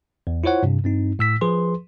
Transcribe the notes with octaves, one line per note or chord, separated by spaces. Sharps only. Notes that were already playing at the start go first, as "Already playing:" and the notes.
E2
E4 F4 C5 C#5 F#5
G2 C3
G2 C4 D#4
A2 E6 B6
F3 G#4 B4 C6